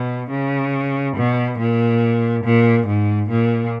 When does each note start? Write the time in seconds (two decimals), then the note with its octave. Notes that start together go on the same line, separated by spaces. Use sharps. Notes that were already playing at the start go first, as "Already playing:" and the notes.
Already playing: B2
0.31 C#3
1.16 B2
1.59 A#2
2.44 A#2
2.87 G#2
3.30 A#2